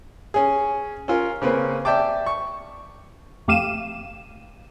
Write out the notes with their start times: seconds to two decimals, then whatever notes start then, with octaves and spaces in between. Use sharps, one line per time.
0.34 C#4 G#4
1.08 C#4 F4 A#4 C#5
1.42 C#3 A#3 C4 C#4 B4
1.85 D5 E5 G5 A5 D6
2.26 C#6
3.48 F2 A3 G4 F5 D#7 E7